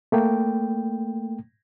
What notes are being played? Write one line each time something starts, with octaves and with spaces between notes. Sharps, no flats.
A3 A#3 G5